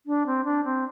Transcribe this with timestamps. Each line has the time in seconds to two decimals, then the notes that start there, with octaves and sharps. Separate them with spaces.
0.06 D4
0.26 C4
0.45 D4
0.64 C4